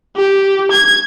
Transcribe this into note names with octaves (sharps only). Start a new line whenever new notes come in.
G4
G#6